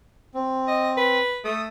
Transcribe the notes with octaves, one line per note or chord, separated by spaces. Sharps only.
C4
D#5
B4
A3 D#6